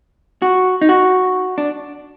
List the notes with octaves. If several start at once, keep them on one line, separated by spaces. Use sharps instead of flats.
F#4
D#4
F#4
D4